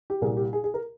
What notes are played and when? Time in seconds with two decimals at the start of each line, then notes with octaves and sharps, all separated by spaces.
0.10 G4
0.21 C2 A#2 G3 A#3 G#4
0.37 G4
0.53 G#4
0.64 G#4
0.74 A#4